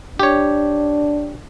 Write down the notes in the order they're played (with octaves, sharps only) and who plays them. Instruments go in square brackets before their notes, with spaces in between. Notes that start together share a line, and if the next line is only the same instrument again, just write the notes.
[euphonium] D4 [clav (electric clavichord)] G4 C#5